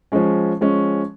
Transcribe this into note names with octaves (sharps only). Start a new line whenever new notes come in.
F3 G#3 C#4
F3 G#3 C#4